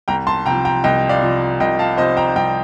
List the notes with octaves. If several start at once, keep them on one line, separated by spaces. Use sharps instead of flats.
C2 G5 A#5
A5 C6
C3 F3 G5 A#5
G5 A#5
C2 D#5 G5
D5 F5
C3 F3
C2 D#5 G5
F5 A5
C3 F3 C5 D#5
G5 A#5
C2 G5 A#5